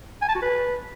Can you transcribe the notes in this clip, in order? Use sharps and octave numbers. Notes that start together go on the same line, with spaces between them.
G#5
A5
F#4
B4